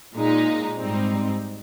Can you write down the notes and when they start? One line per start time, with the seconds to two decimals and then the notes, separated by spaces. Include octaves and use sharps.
0.15 A#2 G#3 D#4
0.77 G#2 G3 C4 D#4